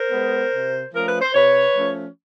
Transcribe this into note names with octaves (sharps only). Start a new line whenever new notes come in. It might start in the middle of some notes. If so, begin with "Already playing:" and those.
Already playing: A#4 C5
G#3 B3
C3
F3 A3 C#4 A#4
B4
C5
C3 B4 C#5
F3 A3 C#4